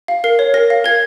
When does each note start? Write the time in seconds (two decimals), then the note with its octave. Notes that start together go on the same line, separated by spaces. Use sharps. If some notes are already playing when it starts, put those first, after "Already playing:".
0.08 F5
0.24 A#4 C7
0.39 C#5
0.54 A#4 A#6
0.70 F5
0.84 A#4 G#6